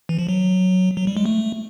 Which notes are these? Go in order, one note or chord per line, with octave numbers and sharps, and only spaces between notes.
E3
F3
F#3
F#3
G3
G#3
A3